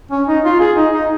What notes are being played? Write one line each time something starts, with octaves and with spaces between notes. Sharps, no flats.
C#4
D#4
F4
G#4
D#4
D#4